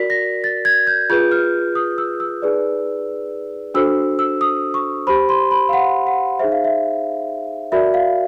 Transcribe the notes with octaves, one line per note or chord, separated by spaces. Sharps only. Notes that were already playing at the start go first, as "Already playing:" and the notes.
Already playing: F#4 A#4 D5 B6
A#6
A6
G#6
G6
F4 G#4 B4 G6
F6
D#6
E6
E6
D#4 G#4 B4 D5
D4 F#4 A4 C5 E6
E6
D#6
C#6
G4 C5 B5
C6
B5
F5
F#5
F#5
D#4 G#4 C5 E5
F5
E5
F#4 A#4 D5 E5
F5